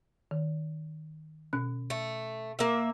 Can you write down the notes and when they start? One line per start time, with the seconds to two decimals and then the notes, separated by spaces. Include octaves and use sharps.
0.31 D#3
1.53 B2 C#4 F#6
1.90 A3
2.59 A#3 E5